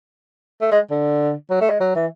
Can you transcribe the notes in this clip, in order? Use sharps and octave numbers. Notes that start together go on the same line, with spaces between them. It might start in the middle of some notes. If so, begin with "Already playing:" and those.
A3
G#3
D3
F#3
A3
G#3
F#3
E3